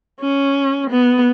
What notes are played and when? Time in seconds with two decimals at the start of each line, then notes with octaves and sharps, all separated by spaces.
0.21 C#4
0.90 B3